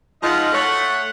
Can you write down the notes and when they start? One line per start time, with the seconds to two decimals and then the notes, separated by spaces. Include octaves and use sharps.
0.22 G#2 F3 D#4 F4 D#5 F#5
0.53 A3 C#5 F#5